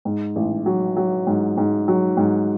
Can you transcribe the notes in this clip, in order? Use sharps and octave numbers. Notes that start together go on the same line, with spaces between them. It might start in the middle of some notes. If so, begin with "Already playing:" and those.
G#2
A1
F#3
F#3
G#2
G#2
F#3
G#2